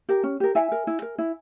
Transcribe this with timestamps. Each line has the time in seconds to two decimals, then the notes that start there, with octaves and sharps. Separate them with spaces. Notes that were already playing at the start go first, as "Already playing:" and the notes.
0.09 G4 A#4
0.23 C#4
0.40 G4 A#4
0.55 E4 E5 G#5
0.72 A#4
0.87 E4
1.02 A#4
1.18 E4